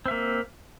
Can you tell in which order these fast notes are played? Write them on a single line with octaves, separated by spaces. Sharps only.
C4 E5 A#3